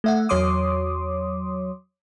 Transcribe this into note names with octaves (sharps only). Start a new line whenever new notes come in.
A3 E5 F#5
E2 F#3 C#5 C6 D6 D#6